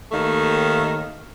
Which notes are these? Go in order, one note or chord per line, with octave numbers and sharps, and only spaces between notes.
D#2 D#3 A3